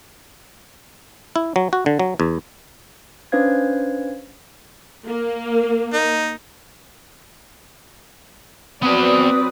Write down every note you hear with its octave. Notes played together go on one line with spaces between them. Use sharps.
E4
F#3
F#4
D3
F#3
E2
C#4 D4 B4 C5 F5 G#6
A#3
D#4
F#3 B3 C4 B4 D5 G#5 D#6